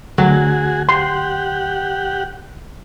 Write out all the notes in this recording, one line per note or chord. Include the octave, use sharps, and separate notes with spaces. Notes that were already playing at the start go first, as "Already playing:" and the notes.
D2 F#3 F#4 G#4
G4 F#5 C6